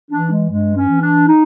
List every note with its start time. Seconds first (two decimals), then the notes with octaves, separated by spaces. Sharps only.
0.11 E3 D4
0.31 G#3
0.49 G2 G#3
0.76 C#4
0.89 E3
1.01 D4
1.27 D#4